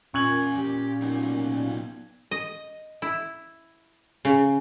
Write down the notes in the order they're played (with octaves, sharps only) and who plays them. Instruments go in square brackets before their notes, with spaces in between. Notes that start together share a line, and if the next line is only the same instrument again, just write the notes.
[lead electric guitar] E2 G#5 [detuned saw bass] A#2 [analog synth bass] C#4 [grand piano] C#6 G#6 F#7
[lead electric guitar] G4
B3 D#4
[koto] D#5
E4
C#3